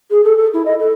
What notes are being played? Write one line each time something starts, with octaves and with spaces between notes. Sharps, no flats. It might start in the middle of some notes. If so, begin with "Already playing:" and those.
G#4
A4
A4
E4
D#5
A4